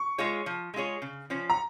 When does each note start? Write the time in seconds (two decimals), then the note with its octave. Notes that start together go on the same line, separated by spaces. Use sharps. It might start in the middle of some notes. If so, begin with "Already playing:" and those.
Already playing: C#6
0.18 G#3 F4 G#4 C#5
0.46 F3
0.74 G#3 F4 G#4 C#5
1.02 C#3
1.30 F3 C#4
1.50 A#5